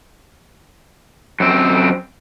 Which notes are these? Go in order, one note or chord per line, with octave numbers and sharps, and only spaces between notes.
F#2 C4